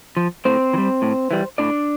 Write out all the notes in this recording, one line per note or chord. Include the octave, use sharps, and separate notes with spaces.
F3
A2 C4 C5
E3
G3
A2
E3 G3
A2 D4 D5